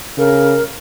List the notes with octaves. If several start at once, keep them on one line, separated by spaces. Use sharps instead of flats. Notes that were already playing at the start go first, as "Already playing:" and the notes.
C#3 A#4